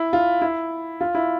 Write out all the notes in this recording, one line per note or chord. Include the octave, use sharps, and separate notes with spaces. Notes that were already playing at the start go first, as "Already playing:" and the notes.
Already playing: E4
F4
E4
F4
E4